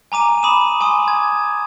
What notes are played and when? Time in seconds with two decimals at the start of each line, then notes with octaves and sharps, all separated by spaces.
0.12 G#5 A#5 D6 D#7
0.43 B5 D6 D#6 D#7 E7
0.81 G#5 C6 D6 D#6
1.08 G#6